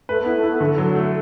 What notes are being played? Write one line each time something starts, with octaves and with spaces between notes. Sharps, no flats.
A3 B4
B3 E4
A3
E4
B3
D3 A3
F#3
A3